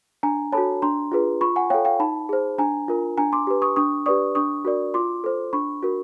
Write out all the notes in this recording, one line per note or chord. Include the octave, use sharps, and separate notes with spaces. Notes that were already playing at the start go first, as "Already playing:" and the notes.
D4 G#5 A#5
F#4 A4 C#5 A5 B5
D4 A#5 C6
F4 G#4 B4
F4 B5 C#6
F#5 G#5
A4 C#5 F5 G5
F5 G5
D#4 A5 B5
G#4 C5
D4 G#5 A#5
F4 A#4
D4 G#5 A#5
C6 D6
G4 B4
C#6 D#6
D4 C#6 D#6
G4 B4 D5 C#6 D#6
D4 C#6 D#6
F#4 A#4 D5
F4 C6 D6
A4 C5
D4 B5 C#6
F#4 A#4